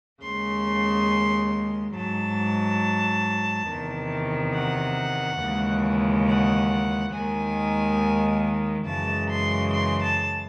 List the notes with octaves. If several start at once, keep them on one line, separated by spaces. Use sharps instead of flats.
D#2 C#3 G#3 C6
G#2 F#3 A5
E2 C3 D#3
F#5
D#2 C#3 E3 G#3
F#5
D#2 D#3 G#3 G#5
F#2 C#3 E3 G#3 A5
C6
C6
A5